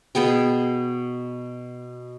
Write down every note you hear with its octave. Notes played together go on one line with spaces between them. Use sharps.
B2 B3 G#4 G5